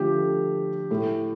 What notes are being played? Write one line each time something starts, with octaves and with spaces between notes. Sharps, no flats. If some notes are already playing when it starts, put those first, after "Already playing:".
Already playing: D3 F3 A3 G4
A2 A3